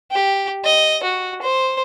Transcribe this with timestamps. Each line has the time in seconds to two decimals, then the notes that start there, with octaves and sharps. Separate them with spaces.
0.11 G4
0.65 D#5
1.03 F#4
1.42 C5